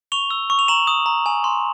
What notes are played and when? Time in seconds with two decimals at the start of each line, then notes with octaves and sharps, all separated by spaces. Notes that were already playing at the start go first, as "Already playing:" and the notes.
0.12 C#6 F7 G7
0.31 E6
0.50 C#6
0.59 F7
0.68 A#5 E7 F#7
0.87 D#6
1.06 A#5
1.26 G#5
1.44 C6